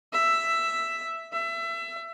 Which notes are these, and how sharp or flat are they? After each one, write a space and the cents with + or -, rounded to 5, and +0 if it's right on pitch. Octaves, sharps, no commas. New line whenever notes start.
E5 +5
E5 +25